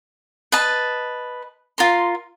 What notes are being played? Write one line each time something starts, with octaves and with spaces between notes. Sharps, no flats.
B4 D#5 A5
F4 A#4 C6